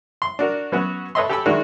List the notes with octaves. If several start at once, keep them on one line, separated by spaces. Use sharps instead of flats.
C6
D4 F#4 A#4
F#3 B3 C#4 F#4
A4 B4 C#5 D#5 E5 C6
G4 A4 G5 G#5 B5 E6
D#3 G#3 D4 E4 F#4 A#4